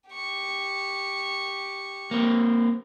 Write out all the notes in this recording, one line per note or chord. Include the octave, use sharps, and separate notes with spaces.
G4 C#6
A#3 C4